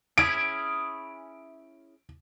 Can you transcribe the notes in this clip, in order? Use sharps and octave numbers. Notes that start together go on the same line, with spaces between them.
C#4 E4 G#4 D7